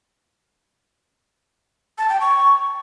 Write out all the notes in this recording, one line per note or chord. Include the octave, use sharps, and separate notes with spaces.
A5
G5
C#6